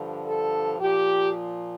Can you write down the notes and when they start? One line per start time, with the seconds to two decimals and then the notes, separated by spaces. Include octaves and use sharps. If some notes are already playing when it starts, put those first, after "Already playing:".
Already playing: G2 D3 F3
0.26 A4
0.80 A#2 F3 G4